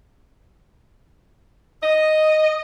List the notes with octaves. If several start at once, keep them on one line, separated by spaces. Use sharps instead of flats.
D#5